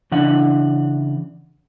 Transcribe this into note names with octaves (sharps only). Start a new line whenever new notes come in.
C#3 E3 D4 F#5